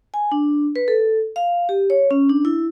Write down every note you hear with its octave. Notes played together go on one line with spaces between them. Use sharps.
G#5
D4
B4
A4
F5
G4
C#5
C#4
D4
E4